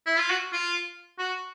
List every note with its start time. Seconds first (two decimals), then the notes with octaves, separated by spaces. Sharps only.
0.06 E4
0.18 F4
0.30 F#4
0.53 F4
1.19 F#4